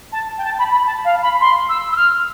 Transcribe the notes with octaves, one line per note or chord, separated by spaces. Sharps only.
A5
G5
A5
B5
B5
A5
F5
B5
C6
E6
E6
F6